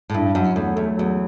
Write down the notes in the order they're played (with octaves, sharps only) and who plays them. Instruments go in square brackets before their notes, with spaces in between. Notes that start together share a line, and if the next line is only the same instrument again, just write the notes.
[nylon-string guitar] A2
[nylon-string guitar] G2 [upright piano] E4
[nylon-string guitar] F#2 [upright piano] F#3
[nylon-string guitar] E2 [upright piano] A3
[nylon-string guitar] E2 [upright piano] A3
[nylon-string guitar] E2 [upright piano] F#3